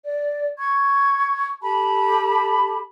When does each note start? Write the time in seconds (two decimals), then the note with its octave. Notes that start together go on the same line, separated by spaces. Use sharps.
0.06 D5
0.59 C#6 G#6
1.62 G4 A4 A5 B5